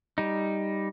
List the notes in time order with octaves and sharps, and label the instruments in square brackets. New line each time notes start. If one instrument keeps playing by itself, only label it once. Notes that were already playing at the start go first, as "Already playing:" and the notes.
[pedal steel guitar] G3 D#4